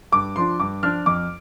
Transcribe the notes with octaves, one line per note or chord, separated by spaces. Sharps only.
G2 D6
F3 D4 F4 C6
G2 D6
F3 D4 F4 F6
F2 D6